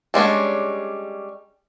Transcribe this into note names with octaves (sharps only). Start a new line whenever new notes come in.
G3 G#3 C#4 D4